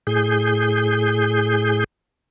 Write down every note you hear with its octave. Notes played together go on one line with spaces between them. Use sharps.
A2 G#4 G6